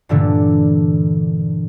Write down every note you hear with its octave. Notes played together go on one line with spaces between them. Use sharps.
G2 A#2 D3 E3 A3